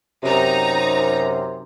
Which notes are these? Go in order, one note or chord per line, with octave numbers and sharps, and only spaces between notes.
F#2 C3 D#4 A#5